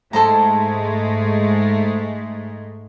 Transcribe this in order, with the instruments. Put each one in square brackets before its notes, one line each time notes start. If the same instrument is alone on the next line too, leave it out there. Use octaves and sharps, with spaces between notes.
[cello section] G#2 G#3 A3 [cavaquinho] A4 C5 A#5